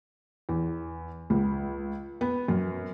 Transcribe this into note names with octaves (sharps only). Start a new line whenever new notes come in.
E2
C#2
B3
F#2